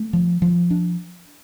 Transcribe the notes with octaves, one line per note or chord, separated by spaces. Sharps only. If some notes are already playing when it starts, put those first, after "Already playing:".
Already playing: A3
F3
F3
D4